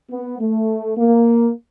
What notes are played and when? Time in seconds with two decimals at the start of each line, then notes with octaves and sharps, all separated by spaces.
0.10 B3
0.40 A3
0.97 A#3